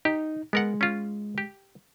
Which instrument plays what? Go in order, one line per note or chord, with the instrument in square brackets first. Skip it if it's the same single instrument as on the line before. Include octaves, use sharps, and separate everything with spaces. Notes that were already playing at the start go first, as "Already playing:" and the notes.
[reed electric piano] D#4 [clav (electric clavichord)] G4
[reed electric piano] G#3 [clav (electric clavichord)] B3 A#4 F#5
[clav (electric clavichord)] C#4 F4
G4